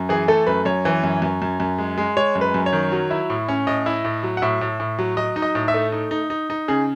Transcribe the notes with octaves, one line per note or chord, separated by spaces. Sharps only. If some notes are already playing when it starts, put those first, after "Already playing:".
Already playing: F#2
E3 G#4
A3 A4
F#2 B4
F#2 C#5
E3
F#2
F#2
F#2
F#2
G#3
G#3
G#3 C#5
F#2
B4
F#2
C#5
D#3
F#3
E4
A2
C#4
A2 D#5
E4
A2
F#3
F#5
A2 E5
A2
A2
F#3
F#3 D#5
D#4
D#5
A2
E5
A3
D#4
D#4
D#4
D#4
C#3 G#4